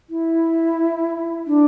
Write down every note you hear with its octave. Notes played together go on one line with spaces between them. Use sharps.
E4
D4